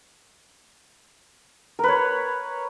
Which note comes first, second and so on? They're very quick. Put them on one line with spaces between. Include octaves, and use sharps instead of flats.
A#4 B4 C#5